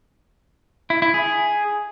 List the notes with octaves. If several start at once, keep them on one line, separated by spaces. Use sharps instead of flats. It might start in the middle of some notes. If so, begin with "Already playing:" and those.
E4
E4
G#4